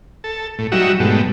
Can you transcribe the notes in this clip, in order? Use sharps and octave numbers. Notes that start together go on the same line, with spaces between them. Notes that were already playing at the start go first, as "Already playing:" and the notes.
A4
A2
F#3 G3 D#4 F#4 E5
G#2 B2 G3 A3